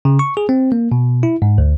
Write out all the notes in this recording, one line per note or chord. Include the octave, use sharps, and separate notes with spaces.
C#3
C#6
G#4
C4
A#3
B2
E4
G#2
D2